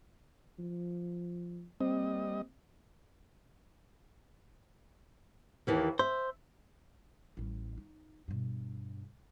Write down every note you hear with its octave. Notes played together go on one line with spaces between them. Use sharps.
F3
G3 A#3 C4 D#5
D#2 E3 A#3
C5 E5
A1 G3
D#4
G2 B2